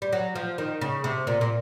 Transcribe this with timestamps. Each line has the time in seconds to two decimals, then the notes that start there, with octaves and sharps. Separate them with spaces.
0.02 G3
0.13 F#3
0.35 F3
0.58 D#3
0.81 C#3
1.04 C3
1.27 A#2
1.41 A#2